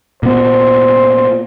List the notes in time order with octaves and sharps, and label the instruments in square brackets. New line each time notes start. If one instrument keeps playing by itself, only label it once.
[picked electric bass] A#2 B3 [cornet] C5